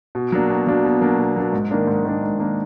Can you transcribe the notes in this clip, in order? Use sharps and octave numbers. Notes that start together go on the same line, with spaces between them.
B2
F#3 A#3 D4
B2
F#3 A#3 D4
B2
F#3 A#3 D4
B2
F#3 A#3 D4
G#2
D#3 A#3 D4
G#2
D#3 A#3 D4
G#2
D#3 A#3 D4